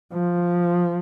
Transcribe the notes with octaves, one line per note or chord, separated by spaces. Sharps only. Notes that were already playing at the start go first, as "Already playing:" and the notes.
F3